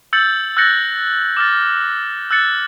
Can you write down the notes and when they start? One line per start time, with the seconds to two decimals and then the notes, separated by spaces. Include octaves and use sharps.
0.13 E6 G6 A6 C#7 F#7
0.57 E6 F#6 G6 A6 A#6 C#7
1.37 D6 F6 A6
2.31 E6 F#6 A6 C#7